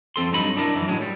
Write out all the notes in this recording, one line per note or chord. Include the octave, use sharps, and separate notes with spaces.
F2 C4 A4 C6
G2 F#3 D#4 B5
D4 E4 A#4
F#2 E3
A2 F#3 G#3
G3